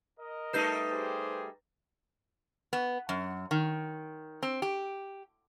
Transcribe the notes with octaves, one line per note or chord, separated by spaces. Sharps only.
A#4 D#5
G3 A3 D#4 B4 G6 C7
G4 G#4 C5
B3
F#2
D#3
C4
G4